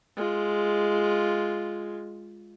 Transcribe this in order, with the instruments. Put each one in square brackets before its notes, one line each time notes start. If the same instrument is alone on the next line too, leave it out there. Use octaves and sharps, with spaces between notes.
[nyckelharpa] G#3 F4